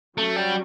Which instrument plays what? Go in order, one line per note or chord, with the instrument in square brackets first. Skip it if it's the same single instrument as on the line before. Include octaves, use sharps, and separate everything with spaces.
[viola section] F#3 C#4 F#4 [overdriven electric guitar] A3
[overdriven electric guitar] G3